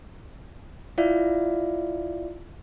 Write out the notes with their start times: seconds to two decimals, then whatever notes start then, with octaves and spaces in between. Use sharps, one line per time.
0.98 E4 F4 D5 E5 F5